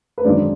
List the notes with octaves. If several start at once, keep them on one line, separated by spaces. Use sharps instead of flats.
B4
G#1 F#2 D3 G#3 D#4 D5